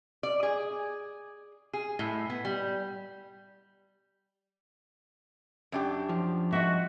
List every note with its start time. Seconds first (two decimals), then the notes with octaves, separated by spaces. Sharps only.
0.23 D5
0.43 G#4
1.73 G#4
1.99 A2
2.30 B3
2.45 G3
5.72 F#2 D4 G4
6.09 F3
6.52 F#4 D#5 E5